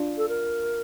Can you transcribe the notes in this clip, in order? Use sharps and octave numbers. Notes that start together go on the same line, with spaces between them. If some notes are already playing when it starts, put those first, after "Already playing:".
Already playing: D4 F4
A4
A#4